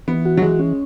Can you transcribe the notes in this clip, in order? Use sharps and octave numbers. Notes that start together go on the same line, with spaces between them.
E3 B3
F#4
F#3
E3 G#3
C#4